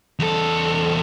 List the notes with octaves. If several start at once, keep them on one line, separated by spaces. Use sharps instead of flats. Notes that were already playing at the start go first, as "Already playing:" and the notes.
E2 A4